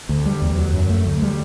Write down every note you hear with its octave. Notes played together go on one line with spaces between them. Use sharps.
D2
G3
E2
F#3
F#2
A3
D2
G3